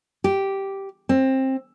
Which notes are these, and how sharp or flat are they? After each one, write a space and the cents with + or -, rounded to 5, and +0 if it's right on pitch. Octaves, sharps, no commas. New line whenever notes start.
G4 -5
C4 +20